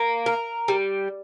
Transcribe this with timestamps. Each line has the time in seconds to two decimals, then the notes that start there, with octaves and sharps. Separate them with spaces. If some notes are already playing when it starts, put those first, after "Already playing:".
Already playing: A#3
0.26 A#4
0.68 G3